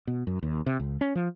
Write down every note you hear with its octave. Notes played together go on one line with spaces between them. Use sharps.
B2
F#2
D#2
C3
C#2
C#4
F3